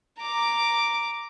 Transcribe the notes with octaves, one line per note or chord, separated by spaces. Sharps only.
A#5 D6